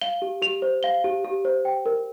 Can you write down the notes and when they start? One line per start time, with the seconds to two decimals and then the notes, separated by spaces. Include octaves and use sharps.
0.02 F5 G7
0.22 G4
0.42 G4 F7
0.62 C5
0.83 F5 G7
1.04 G4
1.24 G4
1.45 C5
1.65 G5
1.86 A#4